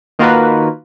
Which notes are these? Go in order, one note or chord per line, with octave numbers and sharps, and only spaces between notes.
D#3 A#3 F4 F#4 A#4 B4